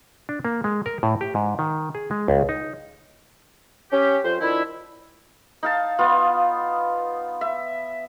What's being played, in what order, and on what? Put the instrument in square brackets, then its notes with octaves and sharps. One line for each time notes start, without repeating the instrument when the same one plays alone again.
[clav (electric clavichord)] D4
A#3
G#3
A#4
A2
G4
G#2
D#3
G#4
G#3
C#2
D#4
[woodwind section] C#4 G4
F2 C5
D#3 F3 D4 E4
[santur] D#4 F5 A5
B3 F4
E5